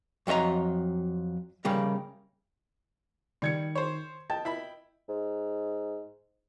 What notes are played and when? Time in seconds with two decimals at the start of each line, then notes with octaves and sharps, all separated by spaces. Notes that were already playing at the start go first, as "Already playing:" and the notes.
0.27 F2 F#3 A4 D#5 A#5
1.65 C#3 G3 A#3
3.42 D#3 G3 G#6 C#7
3.75 C5 C#5
4.30 D#5 G5 A5
4.45 E4 B5
5.09 G#2